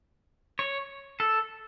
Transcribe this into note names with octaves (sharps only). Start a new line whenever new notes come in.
C#5
A4